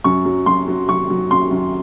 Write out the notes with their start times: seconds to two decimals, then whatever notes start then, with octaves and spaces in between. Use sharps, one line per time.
0.04 F#2 C#6
0.25 F#3
0.46 F#2 C6
0.68 F#3
0.89 F#3 C#6
1.10 F#3
1.31 F#2 C6
1.51 F#2